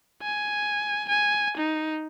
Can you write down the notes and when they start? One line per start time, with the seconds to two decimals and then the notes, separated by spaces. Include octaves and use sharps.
0.22 G#5
1.09 G#5
1.57 D#4